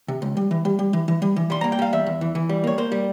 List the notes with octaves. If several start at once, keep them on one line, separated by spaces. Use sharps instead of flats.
C3
C#2
G3
E3
G3
G3
E3
E3
G3
E3
G3 C6
A#3 A#5
G5
G3 F5
E2 E5
E2
E3
E3
G3
A#3 C#5
A#3 C5
G3